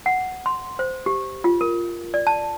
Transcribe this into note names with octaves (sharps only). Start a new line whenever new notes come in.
F#5
C6
C5
G4
F4
A#4
D5
A5